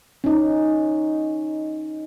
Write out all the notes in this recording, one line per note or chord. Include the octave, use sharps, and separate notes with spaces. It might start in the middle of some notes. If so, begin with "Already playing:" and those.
C#4 D#4